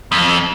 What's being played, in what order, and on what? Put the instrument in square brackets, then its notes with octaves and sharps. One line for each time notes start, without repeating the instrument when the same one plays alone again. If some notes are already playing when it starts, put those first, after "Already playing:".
[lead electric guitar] F2